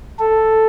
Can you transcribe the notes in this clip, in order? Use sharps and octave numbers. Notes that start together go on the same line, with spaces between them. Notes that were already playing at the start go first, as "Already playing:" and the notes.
A4